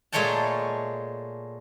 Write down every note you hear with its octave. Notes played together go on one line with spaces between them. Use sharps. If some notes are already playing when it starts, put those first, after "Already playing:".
A#2 G#3 A3 C#5 G5 A5